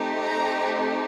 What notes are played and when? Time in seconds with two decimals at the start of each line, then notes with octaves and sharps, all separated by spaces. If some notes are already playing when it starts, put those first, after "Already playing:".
Already playing: A3 C4 D#4 G4
0.24 A#5